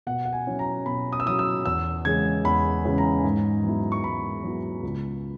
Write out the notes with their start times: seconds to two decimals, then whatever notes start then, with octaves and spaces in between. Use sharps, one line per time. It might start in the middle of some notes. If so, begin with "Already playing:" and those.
0.07 B2 F#5
0.25 F#5
0.33 G#5
0.47 F#3 C#4 E4
0.59 A#5
0.86 B2 B5
1.12 D#6
1.20 E6
1.26 F#3 C#4 E4 D#6
1.39 E6
1.65 E2 E6
2.05 C#3 E3 G#3 C#4 G#6
2.44 E2 B5
2.85 C#3 E3 G#3 C#4
2.98 A#5
3.24 G#2
3.64 F#3 B3 E4
3.92 C#6
4.04 G#2 B5
4.43 F#3 B3 E4
4.83 C#2